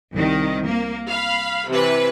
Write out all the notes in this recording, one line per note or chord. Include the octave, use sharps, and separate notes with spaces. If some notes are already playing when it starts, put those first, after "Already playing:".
C2 D#3
A#3
F5 B5
C3 E3 B4